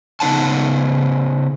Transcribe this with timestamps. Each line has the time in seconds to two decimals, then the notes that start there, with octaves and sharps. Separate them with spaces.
0.20 C#3 B3 D#4 B4 F#5 A5